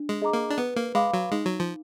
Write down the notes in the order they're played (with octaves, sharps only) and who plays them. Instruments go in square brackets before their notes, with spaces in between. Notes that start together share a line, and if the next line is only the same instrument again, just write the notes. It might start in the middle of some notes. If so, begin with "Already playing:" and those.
Already playing: [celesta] D4
[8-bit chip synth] G#3
[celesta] G#4 D#5 A#5 D6
[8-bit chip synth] A#3
D4
[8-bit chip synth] B3 [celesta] B4
[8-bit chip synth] A#3
[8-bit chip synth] G#3 [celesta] F5 B5 D6
[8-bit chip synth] F#3
[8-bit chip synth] G#3 [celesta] D#4
[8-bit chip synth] F#3
F3